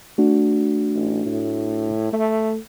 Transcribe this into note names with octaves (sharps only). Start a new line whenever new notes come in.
A3 D4 F#4
A1
A2
A3